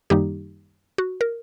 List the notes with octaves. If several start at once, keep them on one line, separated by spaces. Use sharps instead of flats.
F#2 D#3 G3 A#3 D#4 G4
F#4
A#4